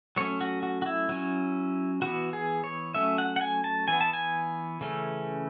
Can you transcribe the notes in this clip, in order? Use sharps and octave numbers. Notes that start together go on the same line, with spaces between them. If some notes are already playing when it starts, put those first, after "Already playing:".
F#3 A3 C#4 C#5
F#4
F#4
F#4
E4
F#3 C#4
E3 B3 F#4
G#4
C#5
F#3 A3 C#4 E5
F#5
F#5
G#5
A5
E3 B3 G#5
A5
G#5
C#3 E3 A3 C#4